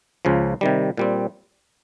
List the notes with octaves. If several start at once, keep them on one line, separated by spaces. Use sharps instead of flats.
C#2 C#3 F3
C3 D#3 G3
A#2 G3 C4